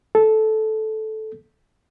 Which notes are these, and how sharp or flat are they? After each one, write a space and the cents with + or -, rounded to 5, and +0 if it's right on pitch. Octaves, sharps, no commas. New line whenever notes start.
A4 -10